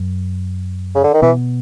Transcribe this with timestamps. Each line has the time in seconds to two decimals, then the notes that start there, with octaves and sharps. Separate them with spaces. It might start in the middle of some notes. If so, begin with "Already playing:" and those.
Already playing: F#2 F#3
0.95 C#3
1.04 D3
1.14 D#3
1.22 B2 E3 B3